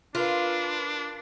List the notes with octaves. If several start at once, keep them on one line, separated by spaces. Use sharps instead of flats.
D4 F4 A#4 B4